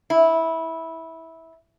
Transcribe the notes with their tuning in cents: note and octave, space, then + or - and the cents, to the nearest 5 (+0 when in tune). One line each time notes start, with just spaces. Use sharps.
E4 -15